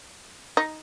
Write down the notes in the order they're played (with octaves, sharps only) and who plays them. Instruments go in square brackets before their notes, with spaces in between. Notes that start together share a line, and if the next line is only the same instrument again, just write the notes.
[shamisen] D#4